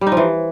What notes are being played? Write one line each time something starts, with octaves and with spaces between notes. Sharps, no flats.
G3
D#4
F3
E3